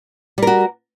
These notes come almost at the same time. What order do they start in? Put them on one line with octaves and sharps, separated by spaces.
G3 A#4 F#4